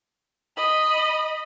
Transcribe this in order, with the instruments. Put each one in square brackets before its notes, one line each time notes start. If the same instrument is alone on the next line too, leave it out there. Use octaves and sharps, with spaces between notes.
[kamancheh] D#5 B5